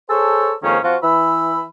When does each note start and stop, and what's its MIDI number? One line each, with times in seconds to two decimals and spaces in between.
0.10 0.53 68
0.10 0.53 69
0.10 0.53 72
0.10 0.53 73
0.10 0.53 81
0.10 0.53 88
0.63 0.77 41
0.63 0.77 44
0.63 0.77 51
0.63 0.77 58
0.63 0.77 61
0.84 0.96 53
0.84 0.96 60
0.84 0.96 65
0.84 0.96 66
1.03 1.63 52
1.03 1.63 83
1.03 1.63 88